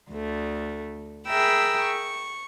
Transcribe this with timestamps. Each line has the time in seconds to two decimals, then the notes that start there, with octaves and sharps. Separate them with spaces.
0.10 D2 A3
1.27 G#4 A#4 E5 G5 B5 E6
1.82 C#6